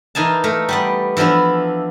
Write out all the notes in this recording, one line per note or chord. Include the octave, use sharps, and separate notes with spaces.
E3 A#3 D#4 G#5 A5
A3 A#4
G3 B3 D5
E3 F3 B3 D4 E4